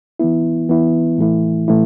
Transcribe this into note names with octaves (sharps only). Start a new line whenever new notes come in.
E3 B3 E4
E3 B3 E4
A2 E3 A3 E4
A2 E3 A3 E4